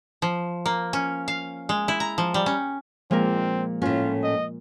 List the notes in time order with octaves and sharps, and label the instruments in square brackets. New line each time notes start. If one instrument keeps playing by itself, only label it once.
[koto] F3
A#3
C#4
F5
G#3
E4
A#5
F3
G3
C#4
[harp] A#2 A#4 [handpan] F3 G#3 [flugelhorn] C4
[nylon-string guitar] A2 C#4 [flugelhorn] F4
[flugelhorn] D#5